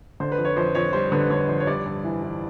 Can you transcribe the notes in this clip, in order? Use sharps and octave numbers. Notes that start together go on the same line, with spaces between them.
D3 C5
B4
F2
C#5
F2 C5
F2 C#5
G3 C5
D3 B4
D3 C#5
F2 C5
C#5
G3 D5
G2
E3
E3